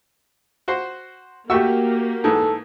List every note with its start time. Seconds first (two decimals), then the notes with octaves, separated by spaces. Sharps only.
0.68 F#4 C5 C6
1.50 A3 A#3 F#4 G4 C#6 E6
2.24 G#2 E3 A4